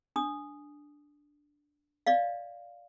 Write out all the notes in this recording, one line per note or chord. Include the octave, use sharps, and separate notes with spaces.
D4 D#6
D5 D#5 F5